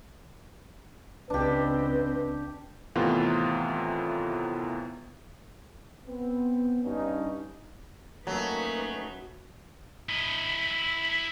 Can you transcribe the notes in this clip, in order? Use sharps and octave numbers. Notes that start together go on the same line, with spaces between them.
C#2 C4 D4 G4 B4
A2 C3 D#3 E3 B3 F4
B3 C4
G2 C#4 D#4
F#3 A3 A#3 C#4 D#4 B4
E4 D#5